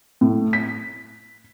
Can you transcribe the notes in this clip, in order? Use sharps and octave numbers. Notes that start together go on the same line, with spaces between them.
A2
B6